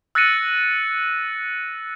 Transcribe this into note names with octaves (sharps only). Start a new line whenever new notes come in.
E6 F#6 A6 A#6 C#7 D#7